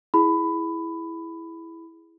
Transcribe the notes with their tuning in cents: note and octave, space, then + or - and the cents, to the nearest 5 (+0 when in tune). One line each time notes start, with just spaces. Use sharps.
E4 +0 G#4 +0 B5 +15